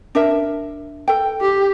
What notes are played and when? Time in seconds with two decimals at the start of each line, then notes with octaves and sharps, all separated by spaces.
0.15 D4 A#4 E5
1.08 A4 G5
1.41 G4